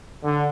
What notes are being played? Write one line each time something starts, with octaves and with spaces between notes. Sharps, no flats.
D3